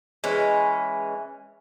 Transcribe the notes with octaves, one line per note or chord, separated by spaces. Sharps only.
E3 G#3 C#4